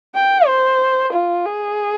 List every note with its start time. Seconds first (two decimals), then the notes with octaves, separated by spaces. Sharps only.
0.15 G5
0.46 C5
1.13 F4
1.45 G#4